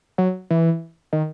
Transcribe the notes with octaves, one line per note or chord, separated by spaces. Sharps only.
F#3
E3
D#3